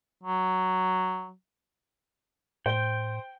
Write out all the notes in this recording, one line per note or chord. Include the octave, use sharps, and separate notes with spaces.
F#3
A2 C5 G5 G7